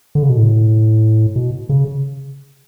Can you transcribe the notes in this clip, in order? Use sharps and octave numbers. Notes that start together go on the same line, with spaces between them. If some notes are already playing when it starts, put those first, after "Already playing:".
D3
C#3
B2
A2
B2
C#3